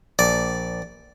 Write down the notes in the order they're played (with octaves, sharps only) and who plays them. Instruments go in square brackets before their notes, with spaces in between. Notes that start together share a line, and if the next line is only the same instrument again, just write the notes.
[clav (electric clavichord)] A#1 [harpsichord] D5